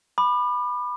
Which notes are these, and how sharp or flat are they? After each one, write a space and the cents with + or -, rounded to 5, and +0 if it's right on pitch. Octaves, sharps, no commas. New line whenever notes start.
B5 +0 D6 +40